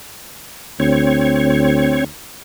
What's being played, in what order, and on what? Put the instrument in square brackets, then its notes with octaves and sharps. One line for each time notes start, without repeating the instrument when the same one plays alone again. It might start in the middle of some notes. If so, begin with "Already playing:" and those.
[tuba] D2 [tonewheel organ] C4 C#5